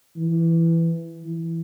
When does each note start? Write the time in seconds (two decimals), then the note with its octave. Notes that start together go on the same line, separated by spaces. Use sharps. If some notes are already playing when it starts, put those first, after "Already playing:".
0.16 E3
1.24 E3